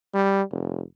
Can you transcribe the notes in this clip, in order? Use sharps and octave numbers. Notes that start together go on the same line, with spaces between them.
G3
F1